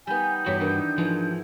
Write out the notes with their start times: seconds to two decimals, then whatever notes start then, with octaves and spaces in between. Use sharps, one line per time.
0.07 G3 B3 D#4 G#5 G6
0.46 E2 G2 F#4 G4 C#5 B5
0.60 D#3 E3 D4
0.98 G#2 E3 F3